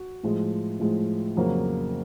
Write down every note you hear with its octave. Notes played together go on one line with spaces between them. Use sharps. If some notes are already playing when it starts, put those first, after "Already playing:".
Already playing: F#4
A2 F3 G#3
A2 F3 G#3
F2 C#3 F#3 A#3